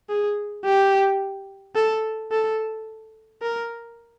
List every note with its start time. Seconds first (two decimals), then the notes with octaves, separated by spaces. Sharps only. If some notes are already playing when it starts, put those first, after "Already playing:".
0.09 G#4
0.64 G4
1.75 A4
2.31 A4
3.42 A#4